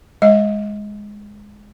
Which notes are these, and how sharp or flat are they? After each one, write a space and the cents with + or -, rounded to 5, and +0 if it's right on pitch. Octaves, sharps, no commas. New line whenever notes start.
G#3 -5 D#5 +30